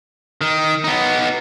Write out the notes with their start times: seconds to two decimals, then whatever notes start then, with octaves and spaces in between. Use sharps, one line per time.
0.41 D#3
0.84 B3 D#4